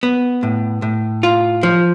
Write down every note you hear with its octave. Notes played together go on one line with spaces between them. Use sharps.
B3
A2
A2
F4
F3